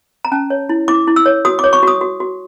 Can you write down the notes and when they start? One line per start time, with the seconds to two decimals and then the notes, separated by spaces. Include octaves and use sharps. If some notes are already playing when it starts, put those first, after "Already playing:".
0.25 A#5
0.32 C#4 A5
0.50 C#5
0.69 E4
0.88 E4 D6
1.07 E4
1.16 E6
1.26 C#5
1.45 F#4 D#6
1.59 D6
1.64 C#5
1.73 C#6
1.83 F#4 D#6
2.01 F#4
2.20 F#4